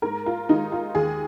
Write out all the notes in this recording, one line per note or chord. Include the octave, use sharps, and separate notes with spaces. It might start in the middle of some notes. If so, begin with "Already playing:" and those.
G#2 A#4
F4
D#3 G#3 D#4
F4
D#2 G#4